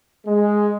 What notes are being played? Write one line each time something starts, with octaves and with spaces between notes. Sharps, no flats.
G#3